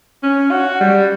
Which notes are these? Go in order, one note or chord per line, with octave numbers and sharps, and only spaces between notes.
C#4
F#4
G3